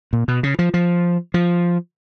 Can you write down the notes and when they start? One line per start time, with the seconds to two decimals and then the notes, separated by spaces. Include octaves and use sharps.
0.13 A#2
0.28 B2
0.43 C#3
0.59 F3
0.74 F3
1.34 F3